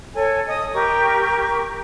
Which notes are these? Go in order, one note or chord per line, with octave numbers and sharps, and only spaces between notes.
A4 C#5 G#5
D#5 D#6
G4 A#4 C#6